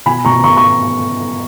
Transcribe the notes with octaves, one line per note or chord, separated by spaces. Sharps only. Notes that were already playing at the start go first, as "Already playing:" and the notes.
B2 G#5 B5
B2 A#5 C#6
B2 A#5 C#6
A#5 C#6